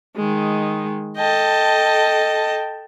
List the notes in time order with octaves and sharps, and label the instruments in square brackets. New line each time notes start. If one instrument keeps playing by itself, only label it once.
[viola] D#3 G#3
[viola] A4 G5 [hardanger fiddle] D#5 A5